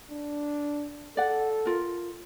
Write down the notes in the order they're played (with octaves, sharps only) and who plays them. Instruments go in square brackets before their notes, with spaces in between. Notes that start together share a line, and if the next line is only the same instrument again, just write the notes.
[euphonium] D4
[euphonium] A4 [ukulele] D5 F#5
[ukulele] F4 A#4